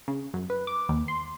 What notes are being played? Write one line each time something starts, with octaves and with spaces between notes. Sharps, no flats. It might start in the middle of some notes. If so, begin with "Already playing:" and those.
C#3
F#2
B4
D6
D#2
C6